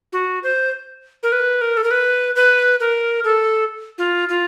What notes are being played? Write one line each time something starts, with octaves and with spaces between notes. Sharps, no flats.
F#4
C5
A#4
B4
A#4
A4
A#4
B4
B4
A#4
A4
F4
F4